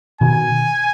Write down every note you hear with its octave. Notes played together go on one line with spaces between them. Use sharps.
B2 D#3 G#5